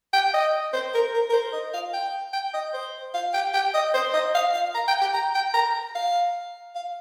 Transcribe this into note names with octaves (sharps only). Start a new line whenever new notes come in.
G5
D#5
C5
A#4
A#4
A#4
C5
D#5
F5
G5
G5
D#5
C5
F5
G5
G5
D#5
C5
D#5
F5
F5
A#5
G5
G5
A#5
G5
A#5
F5
F5